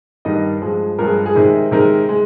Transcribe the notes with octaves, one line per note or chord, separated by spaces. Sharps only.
G2 D#3 G3 D#5
G2 F3 G#3
G2 F3 G#3 A#4
G#4
G#4
C3 D#3 G#3
C3 D#3 G#3 A#4
G#3